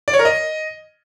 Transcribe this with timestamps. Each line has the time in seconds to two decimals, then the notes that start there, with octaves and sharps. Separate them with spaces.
0.08 D5
0.13 C#5
0.19 A#4
0.25 D#5